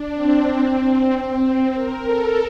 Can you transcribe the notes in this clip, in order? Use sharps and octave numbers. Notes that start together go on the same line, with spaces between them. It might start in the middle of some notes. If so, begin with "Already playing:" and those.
Already playing: D4
C4
C4
A#4
A4